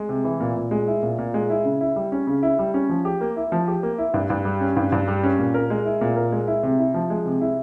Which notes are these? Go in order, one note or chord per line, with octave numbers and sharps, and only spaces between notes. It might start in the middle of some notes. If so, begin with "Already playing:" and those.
Already playing: G#3
C3
E3
A#2
A#2
G#3
E4
A#2
A#2
G#3
E4
C#3
E4
G3
C#4
C#3
E4
G3
C#4
F3
G4
A#3
E4
F3
G4
A#3
E4
G2
G2
G3
C#4
G2
G2
G3
C#4
A#2
A#4
G#3
E4
A#2
A#4
G#3
E4
C3
E4
F3
G#3
C3
E4